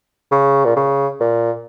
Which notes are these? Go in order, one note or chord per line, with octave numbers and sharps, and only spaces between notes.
C#3
A#2
C#3
A#2